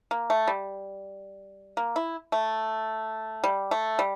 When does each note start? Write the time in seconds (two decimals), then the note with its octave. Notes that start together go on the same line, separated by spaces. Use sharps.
0.11 A#3
0.30 A3
0.47 G3
1.77 A#3
1.96 E4
2.32 A3
3.44 G3
3.71 A3
3.99 G3